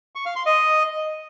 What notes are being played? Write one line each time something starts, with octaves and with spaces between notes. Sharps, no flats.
C#6
F5
C6
D#5